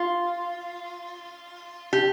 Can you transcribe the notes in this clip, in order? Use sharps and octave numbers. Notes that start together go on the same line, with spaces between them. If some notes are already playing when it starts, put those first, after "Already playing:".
Already playing: F4
G4